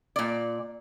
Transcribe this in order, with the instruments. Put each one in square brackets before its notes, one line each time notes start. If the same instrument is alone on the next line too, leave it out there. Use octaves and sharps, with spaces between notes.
[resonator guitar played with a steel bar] A#2 D5